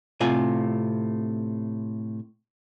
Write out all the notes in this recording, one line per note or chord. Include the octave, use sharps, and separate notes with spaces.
A2 C3 F4 G#5